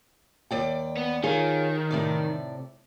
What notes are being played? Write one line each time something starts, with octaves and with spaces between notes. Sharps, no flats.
D#2 D5 G5
B3
D#3 F4 G#4 C#5
A2 C3 D5